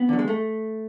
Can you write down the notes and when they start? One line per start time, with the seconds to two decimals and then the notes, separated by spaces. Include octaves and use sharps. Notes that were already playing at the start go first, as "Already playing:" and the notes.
Already playing: B3
0.09 D3 F#3
0.19 G#3
0.28 A3